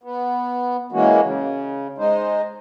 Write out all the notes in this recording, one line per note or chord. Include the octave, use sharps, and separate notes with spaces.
B3
E3 G#3 A#3 C#4 F#4
C#3
G#3 D#4 C5